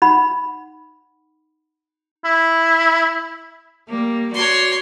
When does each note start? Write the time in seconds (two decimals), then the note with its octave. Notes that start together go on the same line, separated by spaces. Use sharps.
0.02 D#4 F#5 B5
2.25 E4
3.89 G3 A#3
4.34 F#4 C#5 D5 C6